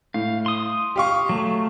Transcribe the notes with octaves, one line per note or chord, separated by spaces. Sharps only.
A2 F5
C6 D#6
G4 F5 C#6
F#3 A3